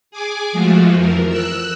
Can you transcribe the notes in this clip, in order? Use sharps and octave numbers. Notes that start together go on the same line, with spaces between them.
G#4 G#5 D6
F3 G#3 A3 F4 F#4
F2 E3 A#4
E6 F#6